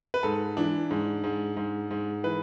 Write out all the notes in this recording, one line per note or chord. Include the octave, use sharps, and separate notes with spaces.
B4
G#2 A4
E3 D4
G#2
G#2
G#2
G#2
E3 B4